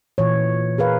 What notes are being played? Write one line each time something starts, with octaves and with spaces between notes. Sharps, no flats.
A#2 E3 C#5
G#4 A#4 B4 F5